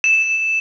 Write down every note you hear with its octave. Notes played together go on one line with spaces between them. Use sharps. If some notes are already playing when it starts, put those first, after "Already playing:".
E7